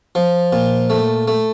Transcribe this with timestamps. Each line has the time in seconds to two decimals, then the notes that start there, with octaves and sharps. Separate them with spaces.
0.15 F3
0.53 A#2
0.90 A3
1.28 A3